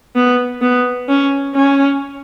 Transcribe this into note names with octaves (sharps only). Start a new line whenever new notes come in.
B3
B3
C#4
C#4